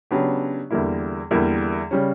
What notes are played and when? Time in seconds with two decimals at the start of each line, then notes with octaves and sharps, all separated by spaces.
0.11 C#3 F#3 B3 D4 G4
0.71 E2 D3 G3 A#3 E4
1.31 E2 D3 G3 A#3 E4
1.91 C#3 G3 C#4